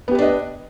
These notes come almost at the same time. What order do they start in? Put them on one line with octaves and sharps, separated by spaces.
B3 G4 B4 D4 D#5